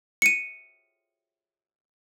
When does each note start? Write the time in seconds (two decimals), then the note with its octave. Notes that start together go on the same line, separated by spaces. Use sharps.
0.22 C#7 D#7